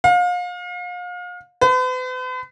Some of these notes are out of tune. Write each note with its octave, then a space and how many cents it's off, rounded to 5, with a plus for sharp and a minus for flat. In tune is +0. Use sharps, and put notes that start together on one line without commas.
F5 +35
B4 +45